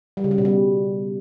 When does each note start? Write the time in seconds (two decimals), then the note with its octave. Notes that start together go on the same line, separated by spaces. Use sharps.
0.17 G3
0.24 C#3
0.31 G3
0.38 B2
0.45 G3